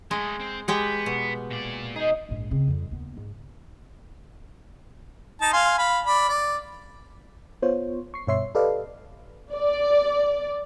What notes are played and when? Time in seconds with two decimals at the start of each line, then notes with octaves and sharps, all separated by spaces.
0.11 G#3 A3 D#5
0.40 C4 C5
0.68 G#3 B3 G4 G5
1.06 B2
1.51 A#2 D5
1.96 D#4 G#4 C5
2.29 A#1 G#2
2.51 C#3 C4
2.68 F2 G3
2.91 D#2 B3
3.17 G#2
5.41 D#4 A5
5.53 F5 G#5 C6
5.79 F5 B5
6.06 D5 B5
6.29 D5
7.62 B3 F4 C5 C#5
8.14 C#6 C7
8.27 G2 B2 C#5 E5 C6 C7
8.55 G4 A4 B4 D5 D#5 F5
9.54 D5